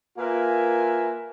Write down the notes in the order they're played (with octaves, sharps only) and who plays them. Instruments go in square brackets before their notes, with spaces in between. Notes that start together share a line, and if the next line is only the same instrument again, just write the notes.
[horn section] A#3 F4 A#4 B4 E5 G#5